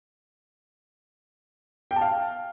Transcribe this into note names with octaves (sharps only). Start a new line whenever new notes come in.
G5
A5
F5